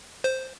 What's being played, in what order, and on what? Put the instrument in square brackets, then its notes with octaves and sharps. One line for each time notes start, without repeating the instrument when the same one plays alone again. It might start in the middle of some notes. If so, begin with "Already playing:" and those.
[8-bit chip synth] C5